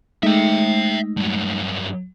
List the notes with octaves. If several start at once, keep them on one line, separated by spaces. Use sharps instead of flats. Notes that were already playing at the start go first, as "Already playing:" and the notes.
G#3 A3 D#4 E5 G5
G2 F#3